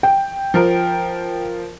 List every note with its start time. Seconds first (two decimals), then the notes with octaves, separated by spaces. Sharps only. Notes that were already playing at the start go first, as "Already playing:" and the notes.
0.03 G5
0.54 F3 A#4